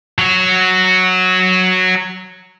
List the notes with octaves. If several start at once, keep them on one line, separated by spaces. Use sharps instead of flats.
F#3 F#4